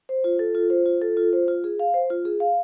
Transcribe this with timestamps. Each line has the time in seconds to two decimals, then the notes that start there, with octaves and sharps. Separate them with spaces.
0.09 C5
0.24 F4
0.39 A4
0.55 F4
0.70 C5
0.86 F4
1.02 A4
1.17 F4
1.33 C5
1.48 F4
1.64 G#4
1.80 F5
1.94 C5
2.10 F4
2.25 G#4
2.40 F5